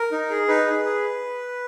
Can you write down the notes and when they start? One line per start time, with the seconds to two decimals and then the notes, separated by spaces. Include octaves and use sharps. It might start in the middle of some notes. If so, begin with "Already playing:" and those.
Already playing: A#4
0.12 D#4
0.30 G#4
0.48 D#4 B4
0.67 G#4
0.85 G#4